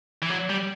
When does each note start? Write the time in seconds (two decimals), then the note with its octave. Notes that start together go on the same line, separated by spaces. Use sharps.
0.23 E3
0.30 F#3
0.50 G3